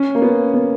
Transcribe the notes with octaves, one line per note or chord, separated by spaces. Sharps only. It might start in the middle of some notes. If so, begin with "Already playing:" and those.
Already playing: C#4
A#3
B3
B3